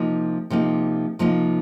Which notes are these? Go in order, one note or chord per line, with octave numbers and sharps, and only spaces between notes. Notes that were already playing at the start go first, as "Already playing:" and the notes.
Already playing: C3 F3 A#3 D#4
C3 F3 A#3 D#4
C3 F3 A#3 D#4